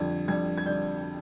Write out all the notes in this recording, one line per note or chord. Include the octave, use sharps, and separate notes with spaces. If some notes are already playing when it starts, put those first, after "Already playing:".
Already playing: F2 D3 G3 G#6
F2 D3 G3 G#6
G#6
D3 G3 G6